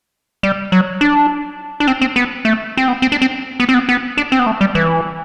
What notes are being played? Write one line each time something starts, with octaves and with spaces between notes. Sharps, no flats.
G3
F#3
D4
D4
C4
C4
B3
A3
C4
B3
C4
D4
C4
B3
C4
B3
B3
D4
C4
B3
A3
G3
E3